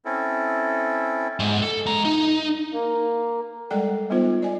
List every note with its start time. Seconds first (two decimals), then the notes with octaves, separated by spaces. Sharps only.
0.05 C4 C#4 E4 A4
1.40 G#2
1.62 A4
1.86 G#3 A#5
2.05 D#4
2.73 A#3
3.71 G3 G#3 A4 D5 F#5 G5
4.10 G3 B3 D#4 F4 C5
4.42 D5 D#5 G#5